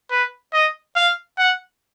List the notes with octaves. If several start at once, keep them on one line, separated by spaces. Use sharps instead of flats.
B4
D#5
F5
F#5